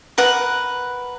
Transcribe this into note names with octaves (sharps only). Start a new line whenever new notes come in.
A#4 B4 F#5